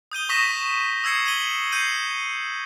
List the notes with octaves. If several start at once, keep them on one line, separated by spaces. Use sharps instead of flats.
D#6 G6 D#7 G7
C#6 D#6 A#6 B6 D#7 E7
D#6 E6 G#6 C7 C#7
G#6 D#7 F#7 G7
G6 C7 C#7 D#7